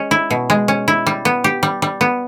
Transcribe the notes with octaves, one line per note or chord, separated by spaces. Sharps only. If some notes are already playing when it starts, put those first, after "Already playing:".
Already playing: G#3 C#4
E4
B2
G#3
C#4
E4
G3
B3
G4
G3
G3
B3